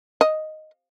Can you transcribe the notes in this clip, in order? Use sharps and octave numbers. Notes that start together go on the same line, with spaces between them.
D#5